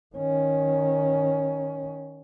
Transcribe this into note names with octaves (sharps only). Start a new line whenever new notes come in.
D#3 C#4